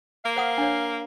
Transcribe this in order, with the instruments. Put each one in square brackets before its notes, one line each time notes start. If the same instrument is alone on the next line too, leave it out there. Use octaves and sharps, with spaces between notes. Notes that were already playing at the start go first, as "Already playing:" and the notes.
[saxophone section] A#3 F5
[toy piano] C5 F#5 D#6
D4 C#5